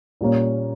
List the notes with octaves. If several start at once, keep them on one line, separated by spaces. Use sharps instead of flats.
A#2 G3 A#3 C#4